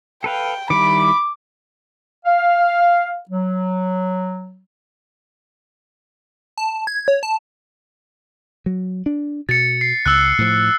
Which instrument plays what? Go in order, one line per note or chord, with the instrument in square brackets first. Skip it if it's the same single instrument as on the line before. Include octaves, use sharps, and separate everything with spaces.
[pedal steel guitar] A4 B4 F5 [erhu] G5
[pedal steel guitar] D#3 G3 E4 [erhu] B5 [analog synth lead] D6
[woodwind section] F5
F#3
[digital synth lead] A5
G#6
C#5
A5
[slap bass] F#3
D4
[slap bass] B2 [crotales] A6 C#7
[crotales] C7
[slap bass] C#2 [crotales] E6 F#6
[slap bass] A2 F3